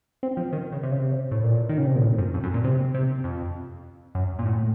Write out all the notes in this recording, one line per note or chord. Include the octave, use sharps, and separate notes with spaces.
C4
F3
D#3
C#3
C3
C#3
C3
A2
A#2
D#3
C#3
C3
A#2
A2
F#2
F2
F#2
A#2
C3
C3
F2
F#2
A#2
A2